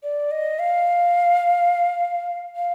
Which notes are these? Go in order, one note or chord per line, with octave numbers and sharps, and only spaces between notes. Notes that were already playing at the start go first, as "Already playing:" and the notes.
D5
D#5
F5
F5